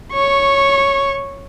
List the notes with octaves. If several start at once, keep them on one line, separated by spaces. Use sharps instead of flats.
C#5 C#6